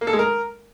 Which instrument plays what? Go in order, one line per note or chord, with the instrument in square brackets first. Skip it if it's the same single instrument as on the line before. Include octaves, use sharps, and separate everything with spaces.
[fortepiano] A#3
A4
G#3
A#4